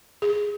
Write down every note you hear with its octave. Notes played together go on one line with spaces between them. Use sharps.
G#4